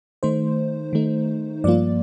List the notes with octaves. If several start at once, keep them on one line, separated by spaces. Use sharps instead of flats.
D#3 A3 D#4 C5
D#3 A3 D#4
G2 F3 A#3 F4 D5